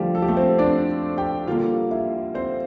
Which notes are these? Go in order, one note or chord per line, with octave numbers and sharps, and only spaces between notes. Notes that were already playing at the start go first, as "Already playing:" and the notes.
Already playing: D3 F3 G3 A3 F4 G4
A4
G4
A3 A4
C4 C5
D4 D5
G4 G5
D3 G3 A#3 F4 F5
E4 E5
C4 C5